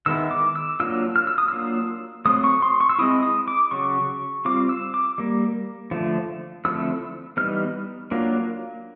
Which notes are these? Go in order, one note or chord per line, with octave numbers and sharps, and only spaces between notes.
D#3 G#3 B3 E4 E6
D6
E6
F#3 A#3 D4 F4 E6
F6
E6
D#6
F#3 A#3 D4 F4 E6
F#3 A3 C4 D#6
C#6
C6
C#6
E6
G#3 C4 E4 D#6
D#6
D6
C#3 F#3 C#6
G3 C4 F4 D6
E6
D6
G3 A#3
D3 F3 A3
D3 F3 A3 C4 E4 E6
E3 G3 B3 D#4 F6
F#3 A#3 D4 F4